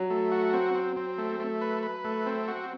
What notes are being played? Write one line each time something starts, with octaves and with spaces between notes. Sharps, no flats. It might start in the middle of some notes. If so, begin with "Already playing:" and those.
Already playing: F#3
A3
F#4
C4
C4
C4
A3
A3
B4
B4
A3
C4
F#4